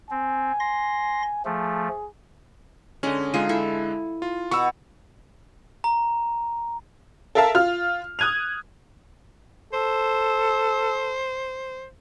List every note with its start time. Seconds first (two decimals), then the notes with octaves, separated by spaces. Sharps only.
0.11 C4 G#5
0.60 C6 A#6
1.45 F3 A3 G#4
3.03 D3 G#3 C#4 D#5
3.34 D3 G#3 D#4 F4 G#4 D#7
3.49 E4 A4 E5
4.22 F4
4.51 B2 F#4 B4 C#6 E6
5.84 A#5
7.35 A4 A#4 E5 F5 A5
7.55 F4 F6
8.19 D#6 F#6 G#6 D#7 F7
9.73 A4 C5